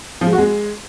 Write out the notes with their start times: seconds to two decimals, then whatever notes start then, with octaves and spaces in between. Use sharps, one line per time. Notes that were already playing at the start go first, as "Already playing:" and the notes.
0.21 F3
0.27 G#3
0.33 F#4
0.38 G#3